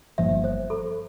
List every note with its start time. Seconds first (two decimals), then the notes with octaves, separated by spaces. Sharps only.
0.18 G1 G2 F3 A#3 E5
0.44 C5
0.70 A4